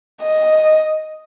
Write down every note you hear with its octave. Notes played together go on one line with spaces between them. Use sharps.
D#5